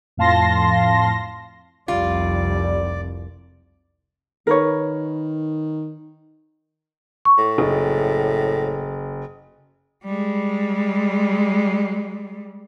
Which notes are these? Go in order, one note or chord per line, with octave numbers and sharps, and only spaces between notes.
F2 A2 F5 A5 C6 A#6
F1 C2 G3 F4 D5
D#3 A#4 B4 C#5
C#6
A2
F#1
G3 G#3